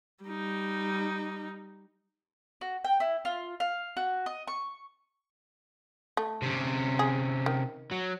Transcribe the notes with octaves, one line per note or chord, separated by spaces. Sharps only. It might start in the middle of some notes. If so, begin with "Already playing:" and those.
G3 D#4
F#4
G5
E4
F4
F5
F#4
D#5
C#6
A3
C3 C#4
G#4
D#3
F#3